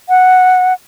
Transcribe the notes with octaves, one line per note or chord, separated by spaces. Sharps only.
F#5